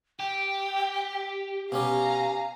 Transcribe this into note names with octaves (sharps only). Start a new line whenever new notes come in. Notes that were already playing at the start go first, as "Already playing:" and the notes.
G4 G5
B2 C#4 G4 F5 G#5 A#5